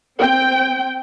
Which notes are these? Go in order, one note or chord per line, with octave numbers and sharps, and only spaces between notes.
C4 G5